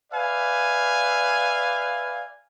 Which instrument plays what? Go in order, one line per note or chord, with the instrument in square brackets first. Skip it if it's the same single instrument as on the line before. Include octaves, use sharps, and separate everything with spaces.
[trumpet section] B4 D5 E5 F5 G#5